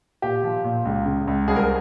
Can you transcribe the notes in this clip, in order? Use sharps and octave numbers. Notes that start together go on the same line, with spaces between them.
A#2 G4
F3
A#2
C#2
C#3
C#2
C2 G#4
A#4